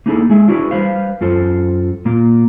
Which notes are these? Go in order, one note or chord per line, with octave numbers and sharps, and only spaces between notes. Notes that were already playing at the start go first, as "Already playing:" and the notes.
A#3 D#4 E4 F#4 G#4 A4
G#3 G#4 E5
D4 E4 F#4 G#4 A#4 B4
G3 B4 C5 F5
F#2 F4 A4 C5
A#2 A#3 F4